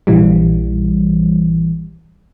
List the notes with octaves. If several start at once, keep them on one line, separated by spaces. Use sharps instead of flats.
A#1 E3 G3